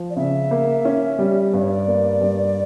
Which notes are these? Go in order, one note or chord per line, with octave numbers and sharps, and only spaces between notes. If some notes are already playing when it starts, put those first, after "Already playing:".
Already playing: F3
D5
C#3 E5
A#3
C#4
G3
G2 D5
C#5
D5
A#3
G2